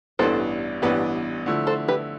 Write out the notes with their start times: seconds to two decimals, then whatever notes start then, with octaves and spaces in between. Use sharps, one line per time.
0.19 A1 G2 E3 B3 D4 A4 C5
0.82 A1 G2 E3 B3 D4 G4 B4
1.46 D3 F3 A3 E4
1.67 A4 C5
1.88 G4 B4